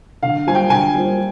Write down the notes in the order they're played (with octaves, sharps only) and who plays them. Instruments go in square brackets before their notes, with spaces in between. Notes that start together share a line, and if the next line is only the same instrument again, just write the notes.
[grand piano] D3 [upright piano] F5
[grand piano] G3 A#3 F4 C5 [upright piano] G#5
[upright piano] G5
[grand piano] D3 [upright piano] G#5
[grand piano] G3 A#3 F4 C5